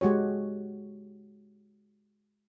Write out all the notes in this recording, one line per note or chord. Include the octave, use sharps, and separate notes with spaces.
G#3 F#4 G4 C#5